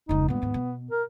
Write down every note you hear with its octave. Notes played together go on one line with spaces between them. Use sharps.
F1 C#2 D#4
G2 A#2 B3
D#2 G#2
B2
A#4